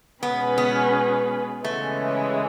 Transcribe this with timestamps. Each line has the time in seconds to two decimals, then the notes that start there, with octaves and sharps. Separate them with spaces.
0.22 B2 G#3 B3 C#4 G#4 B4
0.58 B3
1.64 C#3 E3 G#3 A3 C#4